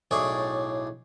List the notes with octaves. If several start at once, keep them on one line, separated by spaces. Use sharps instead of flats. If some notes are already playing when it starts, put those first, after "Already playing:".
B1 A2 G#4 C#5 D5